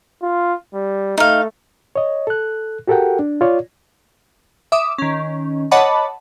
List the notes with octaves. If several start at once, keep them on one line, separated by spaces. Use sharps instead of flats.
F4
G3
A3 D#4 F5
C#5 D#5
A4 F#6
F#4 G4 A4 A#4 F#5 G5
D4
F4 C#5 D5
E5 D6 D#6
D#3 C#4
C#5 D#5 F#5 A5 B5 D6